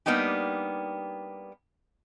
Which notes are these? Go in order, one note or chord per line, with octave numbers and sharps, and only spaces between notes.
G3 A#3 B3 D4 D#4 G4